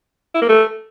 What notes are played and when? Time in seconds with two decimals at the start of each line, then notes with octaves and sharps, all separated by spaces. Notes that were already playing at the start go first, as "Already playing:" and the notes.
0.34 E4
0.42 A#3
0.49 A3